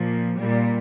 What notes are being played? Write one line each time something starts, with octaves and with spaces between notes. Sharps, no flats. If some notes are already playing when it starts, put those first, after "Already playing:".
Already playing: A#2 F3
A#2 G3